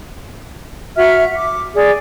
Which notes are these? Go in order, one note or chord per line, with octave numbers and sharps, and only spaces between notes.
F#4 E5 F6
D6
G#4 D5